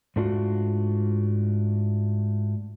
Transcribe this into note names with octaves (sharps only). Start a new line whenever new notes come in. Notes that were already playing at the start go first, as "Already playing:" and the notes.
G#2 A3 D4 F4 F#4